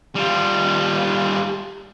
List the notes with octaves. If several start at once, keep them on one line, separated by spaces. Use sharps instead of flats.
G3 F4